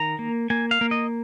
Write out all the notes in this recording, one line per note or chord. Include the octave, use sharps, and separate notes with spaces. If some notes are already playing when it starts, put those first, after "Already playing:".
Already playing: D#3 A#5
A#3
A#3 G#5
F5
A#3
D#5